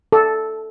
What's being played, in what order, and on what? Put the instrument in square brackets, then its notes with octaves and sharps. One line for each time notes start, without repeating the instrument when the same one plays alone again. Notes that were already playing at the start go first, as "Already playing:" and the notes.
[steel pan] A4